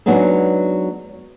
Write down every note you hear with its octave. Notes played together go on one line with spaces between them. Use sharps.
F#3 G#3 B3 D4 D#4